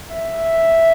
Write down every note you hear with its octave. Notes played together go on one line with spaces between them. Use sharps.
E5